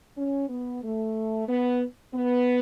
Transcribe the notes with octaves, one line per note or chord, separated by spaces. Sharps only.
C#4
B3
A3
B3
B3